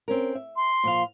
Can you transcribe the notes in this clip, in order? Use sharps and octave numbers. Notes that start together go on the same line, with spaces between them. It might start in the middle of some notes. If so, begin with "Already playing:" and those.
C4 C#4 A#4
E5
C6
A#2 F3 F5